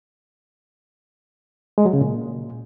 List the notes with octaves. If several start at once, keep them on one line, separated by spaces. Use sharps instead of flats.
G#3
F#3
C#3
A#2